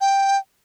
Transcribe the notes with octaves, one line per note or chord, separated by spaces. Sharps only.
G5